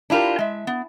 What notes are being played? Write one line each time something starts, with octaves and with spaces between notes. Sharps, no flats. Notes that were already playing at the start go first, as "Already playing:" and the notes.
D4 E4 F4 G4 A#4
G#3 E5
B3